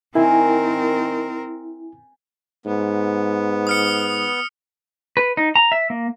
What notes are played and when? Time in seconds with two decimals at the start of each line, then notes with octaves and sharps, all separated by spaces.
0.15 D#3 C4 E4 A#4 G#5
2.66 G#2 B3
3.67 D#6 F6 C#7
5.17 B4
5.37 D#4
5.56 A#5
5.72 E5
5.90 A#3